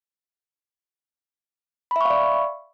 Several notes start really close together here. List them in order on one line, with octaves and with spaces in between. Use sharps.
B5 E5 C#6 F5 D5